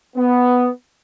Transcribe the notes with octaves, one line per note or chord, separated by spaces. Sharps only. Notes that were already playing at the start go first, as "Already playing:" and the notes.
B3